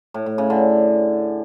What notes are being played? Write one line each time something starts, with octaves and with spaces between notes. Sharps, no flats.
A2
A2
C#3
D3